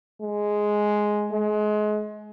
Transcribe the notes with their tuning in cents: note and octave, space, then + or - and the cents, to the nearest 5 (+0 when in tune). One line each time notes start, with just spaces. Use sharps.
G#3 +5
G#3 +30